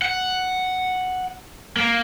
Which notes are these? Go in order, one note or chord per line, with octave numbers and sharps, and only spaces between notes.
F#5
A#3